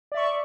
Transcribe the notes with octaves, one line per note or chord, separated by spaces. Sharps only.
D5 E5 C#6